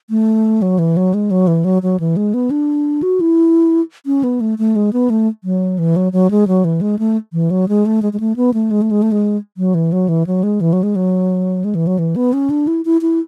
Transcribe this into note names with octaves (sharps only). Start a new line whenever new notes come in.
A3
F#3
E3
F#3
G#3
F#3
E3
F#3
F#3
E3
G#3
B3
D4
F#4
E4
C#4
B3
A3
A3
G#3
B3
A3
F#3
E3
F#3
F#3
G#3
F#3
E3
G#3
A3
E3
F#3
G#3
A3
G#3
G#3
A3
B3
A3
G#3
A3
G#3
A3
G#3
F#3
E3
F#3
E3
F#3
G#3
E3
F#3
G#3
F#3
G#3
E3
F#3
E3
B3
C#4
D4
E4
E4
E4